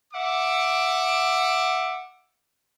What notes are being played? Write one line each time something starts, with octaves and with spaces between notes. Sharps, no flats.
E5 F#5 D6